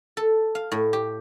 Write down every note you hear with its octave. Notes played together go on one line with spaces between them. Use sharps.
A4
F5
A2
G4